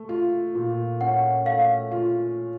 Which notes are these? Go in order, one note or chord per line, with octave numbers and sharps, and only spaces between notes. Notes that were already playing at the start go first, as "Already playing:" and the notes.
Already playing: A3
F4
A#2
C#4 F#5
A3 F5
F4